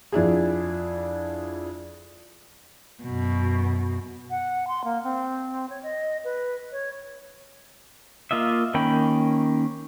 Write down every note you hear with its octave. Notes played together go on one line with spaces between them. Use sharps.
F2 D4 E4 G#4
F#2 B2
F#5
C6
A#3
C4
C#5
D#5
B4
C#5
A#3 F4 D#5 E5
D#3 A#3 C#4 G5 B5